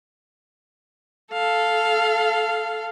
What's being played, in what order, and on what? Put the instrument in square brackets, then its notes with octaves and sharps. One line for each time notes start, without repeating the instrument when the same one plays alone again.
[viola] A4 F5